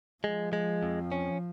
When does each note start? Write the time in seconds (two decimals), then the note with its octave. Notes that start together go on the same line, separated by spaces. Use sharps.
0.24 F3 G#3
0.53 G#3
0.83 F2
1.12 C#4